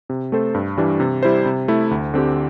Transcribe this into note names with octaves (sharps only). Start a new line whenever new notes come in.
C3
A3 C4 A4 C5
G2
E3 G3 D4
C3
G3 E4 C5
C3
A3 E4
D2
D3 C4 G4